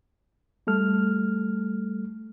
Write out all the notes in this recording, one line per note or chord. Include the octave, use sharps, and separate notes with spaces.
G3 A3 A4 F6